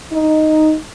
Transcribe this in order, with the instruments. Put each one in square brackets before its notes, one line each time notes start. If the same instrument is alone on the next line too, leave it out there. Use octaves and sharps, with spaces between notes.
[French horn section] D#4